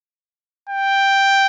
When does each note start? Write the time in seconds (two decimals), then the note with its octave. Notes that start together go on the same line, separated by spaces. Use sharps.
0.69 G5